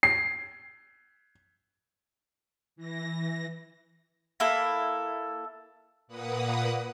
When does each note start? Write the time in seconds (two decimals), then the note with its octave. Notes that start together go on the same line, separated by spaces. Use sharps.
0.03 C7
2.76 E3 A#6
4.40 A#3 E4 A4
6.07 A#2 A#3 B4 F#5 D#6